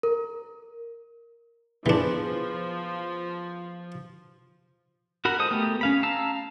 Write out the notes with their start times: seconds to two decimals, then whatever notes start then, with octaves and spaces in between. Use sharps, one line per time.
0.03 A#4
1.86 E3 F3 B3 D4 G#4 B4
5.25 F#4 A#4 B5
5.39 G#3 A4 C5 D#6
5.51 A3 B3 G4 A#4
5.81 C#4 F5 B5
6.03 F5 A5 A#5 E6